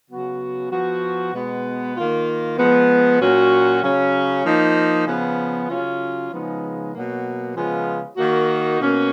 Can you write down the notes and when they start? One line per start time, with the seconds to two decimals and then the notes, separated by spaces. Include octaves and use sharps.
0.09 C#3 F#3 B3 F#4
0.71 F3 B3 F#4
1.33 B2 G#3 B3
1.96 D#3 A#3 F4
2.58 F3 G#3 B3
3.20 A#2 F#3 C#4 F#4
3.82 C#3 F#3 C#4
4.45 F3 A#3 D#4
5.06 C#3 F3 B3
5.68 C#3 F#3 C#4 F4
6.31 C#3 F3 G#3 B3 D#4
6.93 B2 F#3 A#3
7.56 C#3 F3 G#3 B3 F4
8.17 D#3 A#3 D#4 F#4
8.80 B2 A#3 C#4